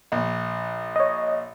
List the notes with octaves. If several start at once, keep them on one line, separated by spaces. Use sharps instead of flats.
A#1
C#5 D#5